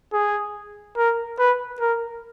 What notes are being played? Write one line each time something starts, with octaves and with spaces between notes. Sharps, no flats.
G#4
A#4
B4
A#4